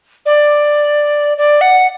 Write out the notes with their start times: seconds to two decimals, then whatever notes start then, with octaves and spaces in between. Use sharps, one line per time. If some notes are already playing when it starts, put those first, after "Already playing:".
0.26 D5
1.38 D5
1.61 F#5